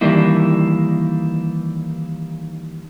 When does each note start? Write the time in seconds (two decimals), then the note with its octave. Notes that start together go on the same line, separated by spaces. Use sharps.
0.01 D#3 E3 G3 A#3 E4